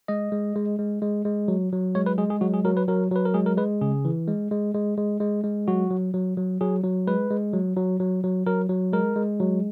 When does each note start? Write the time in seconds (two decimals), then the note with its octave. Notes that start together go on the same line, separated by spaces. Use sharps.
0.08 G#3 D#5
0.32 G#3
0.56 G#3
0.79 G#3
1.02 G#3
1.25 G#3
1.48 F#3
1.72 F#3
1.95 G#3 C#5
2.06 B4
2.18 G#3 G#4
2.30 G#4
2.41 F#3 F#4
2.54 G#4
2.65 F#3 A#4
2.77 B4
2.88 F#3 A#4
3.11 F#3 B4
3.25 A#4
3.34 G#3 G#4
3.46 A#4
3.57 G#3 B4
3.81 C#3 G#4
4.05 E3
4.27 G#3
4.51 G#3
4.74 G#3
4.97 G#3
5.20 G#3
5.44 G#3
5.67 F#3 F#4
5.90 F#3
6.14 F#3
6.37 F#3
6.61 F#3 G#4
6.84 F#3
7.07 G#3 B4
7.30 G#3
7.53 F#3
7.77 F#3
8.00 F#3
8.24 F#3
8.46 F#3 A#4
8.69 F#3
8.92 G#3 A#4
9.16 G#3
9.40 F#3